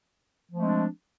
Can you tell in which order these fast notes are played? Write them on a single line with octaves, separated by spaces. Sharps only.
F3 A3 G#3 C4 D4